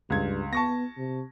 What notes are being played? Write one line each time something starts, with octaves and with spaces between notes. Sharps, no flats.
C#2 G2 G#6
B3 A5 C#6 A#6
C3